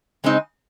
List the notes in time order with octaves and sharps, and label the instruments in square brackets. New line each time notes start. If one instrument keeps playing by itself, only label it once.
[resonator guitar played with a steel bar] C#3 G#3 C4 D#4